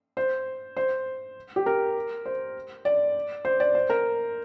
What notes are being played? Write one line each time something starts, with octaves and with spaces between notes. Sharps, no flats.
C5
C5
G4
A#4
C5
D5
C5
D5
C5
A#4